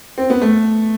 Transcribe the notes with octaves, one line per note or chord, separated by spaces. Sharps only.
C4
B3
A3